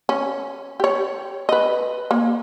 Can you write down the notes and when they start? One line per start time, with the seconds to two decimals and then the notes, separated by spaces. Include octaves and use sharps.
0.09 C#4
0.80 G4 C#5
1.49 B4 D#5
2.11 A#3